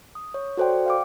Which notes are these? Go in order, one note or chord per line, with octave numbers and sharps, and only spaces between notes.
D#6
C#5
F#4 A4 C5 D5 G5
F5 G5 D6